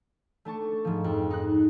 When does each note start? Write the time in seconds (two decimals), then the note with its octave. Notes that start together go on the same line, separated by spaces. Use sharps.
0.45 A3 D4 A5 C#6
0.85 G#2 F3
1.04 F2
1.31 D#4 F#6